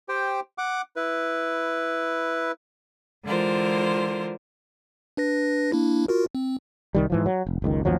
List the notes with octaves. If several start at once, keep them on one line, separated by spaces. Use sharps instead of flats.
G4 C5 G5
F#5 D6
E4 B4
D3 E3 G#3 F4 A#4 C5
D4 B4 A#6
A#3 D4 E4
F4 F#4 A#4
C4
C2 D#3 G3
G#2 E3 F3
F#3
F1
F#1 C#2 D#3
A1 D#2 F3 F#3